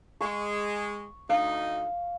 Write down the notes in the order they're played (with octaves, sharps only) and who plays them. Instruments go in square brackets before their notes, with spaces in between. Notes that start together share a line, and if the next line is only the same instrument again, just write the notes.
[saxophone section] G#3 [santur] C#6
[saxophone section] D2 D#4 [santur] F5